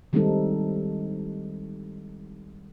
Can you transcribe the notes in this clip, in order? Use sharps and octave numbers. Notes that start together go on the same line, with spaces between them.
D#3 G3 G#3 C4 D#4 A4